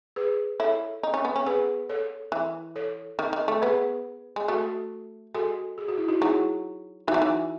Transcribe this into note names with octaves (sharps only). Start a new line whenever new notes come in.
G#4 B4
E4 A4 C#5
D#4
C#4
B3
C#4
B3 G#4 B4
A4 C#5
E3
A4 C#5
D#3
D#3
A3
B3 G#4 B4
G#3
A3 F#4 A4
G#3 F#4 A4
G#4
F#4
E4
D#4 F#4
F#3 E4 G#4
E3 D#4 F#4
F#3
E3